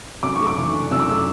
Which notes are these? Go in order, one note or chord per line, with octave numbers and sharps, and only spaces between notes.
F#2 D6
A3 C#6
D6
E3
D4
F#2 E6
D6
A3 E6